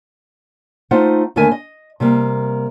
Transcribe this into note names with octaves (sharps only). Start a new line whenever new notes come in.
A3 D#4 F4 C5 F#5
D#2 D3 A3 A#4 E5 G#5
D#5
C3 G3 A#3